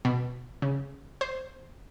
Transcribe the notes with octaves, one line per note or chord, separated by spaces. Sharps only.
B2
C#3
C5